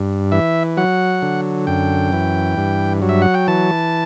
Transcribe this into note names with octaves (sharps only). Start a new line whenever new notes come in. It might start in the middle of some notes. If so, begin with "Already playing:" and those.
Already playing: G2
E3 E5
F#3 F#5
D3
F#2 G5
E3
G2
F#3
E5
F#5
G5
E3 A5